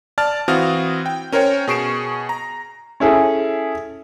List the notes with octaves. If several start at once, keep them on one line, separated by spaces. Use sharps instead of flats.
D5 A5 F6 A6
E3 C4 F#4 F5 D#6 F6
G5
C#4 A#4 C5 C#5 G5
B2 G#4 C#6 C7 D7 E7
A#5
C#4 E4 G#4 A4